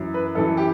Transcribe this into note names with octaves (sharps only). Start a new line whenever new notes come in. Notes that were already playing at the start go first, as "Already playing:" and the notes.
Already playing: F#2 E3
B4
F#2 E3 A4
G4